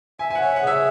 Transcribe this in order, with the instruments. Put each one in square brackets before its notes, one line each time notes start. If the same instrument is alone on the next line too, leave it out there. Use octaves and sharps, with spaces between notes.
[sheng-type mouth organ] E5 [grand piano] G#5
[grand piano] G#5
F#5
[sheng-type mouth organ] C#5
[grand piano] F#5
[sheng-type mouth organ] G#4 [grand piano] E5